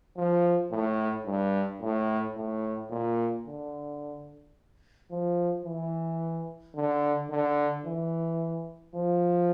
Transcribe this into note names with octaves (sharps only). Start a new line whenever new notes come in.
F3
A2
G2
A2
A2
A#2
D3
F3
E3
D3
D3
E3
F3